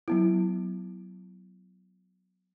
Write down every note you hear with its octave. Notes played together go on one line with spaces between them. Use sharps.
F#3 B3 E4